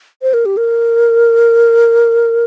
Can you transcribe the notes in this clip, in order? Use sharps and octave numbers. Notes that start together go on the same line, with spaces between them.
C5
A#4
G4
A#4